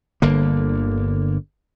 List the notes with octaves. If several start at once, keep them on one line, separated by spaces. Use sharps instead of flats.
G1 D3 A#3